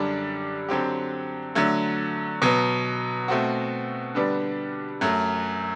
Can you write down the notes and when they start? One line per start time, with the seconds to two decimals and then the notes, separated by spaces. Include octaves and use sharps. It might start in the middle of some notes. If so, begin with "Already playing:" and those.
Already playing: F#2 D3 G3 D4
0.68 D3 F#3 C4 G4
1.55 D3 F#3 A3
2.42 B2 F#3 B3
3.28 B2 A3 C4 F#4
4.15 D3 G3 B3 D4
5.01 F#2 F#3 A3